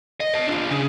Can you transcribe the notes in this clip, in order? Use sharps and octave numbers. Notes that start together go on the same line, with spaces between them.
D#5
D#5 A5
D4 F4
C#3